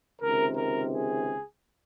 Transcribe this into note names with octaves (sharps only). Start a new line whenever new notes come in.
C#2 C3 D#3 A#4
A#4
G#4